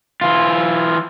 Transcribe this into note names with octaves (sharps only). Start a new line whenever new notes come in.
E3 F4